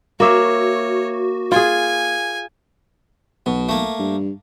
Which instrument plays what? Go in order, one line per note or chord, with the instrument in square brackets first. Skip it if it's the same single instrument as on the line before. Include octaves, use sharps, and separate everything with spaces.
[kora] A#3 E5 F5 [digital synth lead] F#4 [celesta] A#4 D6 [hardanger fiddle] C#5
[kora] F4 G#4 [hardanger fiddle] G#5
[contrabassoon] B1 [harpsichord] B2
[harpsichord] A3 A#3
[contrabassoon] G2